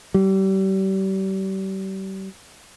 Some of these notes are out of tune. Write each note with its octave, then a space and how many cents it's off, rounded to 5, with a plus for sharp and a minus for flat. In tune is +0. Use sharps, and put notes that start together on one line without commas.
G3 -35